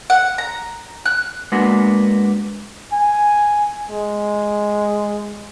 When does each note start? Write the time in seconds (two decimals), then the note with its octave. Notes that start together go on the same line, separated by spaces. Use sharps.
0.10 F#5
0.38 A#5
1.06 F#6
1.52 G#3 A#3 B3 D4 F#4
2.93 G#5
3.90 G#3